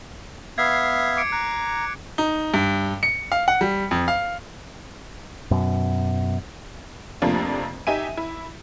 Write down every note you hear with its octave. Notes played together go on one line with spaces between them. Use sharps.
B3 E5 F5 G#6 C7
D6 C#7 D7
A#5 F#6
D#4
G2
C#7
F5
F#5
G3
F2
F5
F#2 B2
F2 C3 F3 A3 A#3 D4
D#4 G4 E5 G#5 D#7
E4